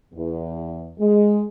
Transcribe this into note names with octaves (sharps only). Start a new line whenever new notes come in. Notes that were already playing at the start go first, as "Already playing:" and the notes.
E2
G#3